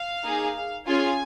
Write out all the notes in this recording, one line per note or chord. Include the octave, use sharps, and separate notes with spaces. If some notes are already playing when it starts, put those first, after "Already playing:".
Already playing: F5
A#3 D#4 G#4
C#4 F4 G#4 G#5